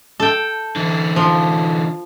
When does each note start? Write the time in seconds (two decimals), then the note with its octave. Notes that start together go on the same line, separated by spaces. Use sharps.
0.20 A4 G5
0.76 D3 E3
1.16 F3